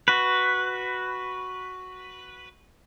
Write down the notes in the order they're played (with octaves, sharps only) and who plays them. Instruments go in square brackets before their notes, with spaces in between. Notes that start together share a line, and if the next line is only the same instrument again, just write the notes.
[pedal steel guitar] F#4 B4